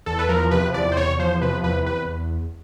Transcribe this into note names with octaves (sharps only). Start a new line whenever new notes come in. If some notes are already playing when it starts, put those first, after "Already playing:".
E2 A4
B4
F3 A#4
C3 B4
E2 D5
C5
E2 C#5
F3 C5
C3 B4
E2 B4
E2 B4